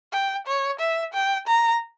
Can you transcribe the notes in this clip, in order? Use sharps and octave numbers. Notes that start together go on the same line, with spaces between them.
G5
C#5
E5
G5
A#5